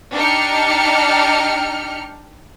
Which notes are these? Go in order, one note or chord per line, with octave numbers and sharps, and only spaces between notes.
D4 D#4 G4 G5 F6 C#7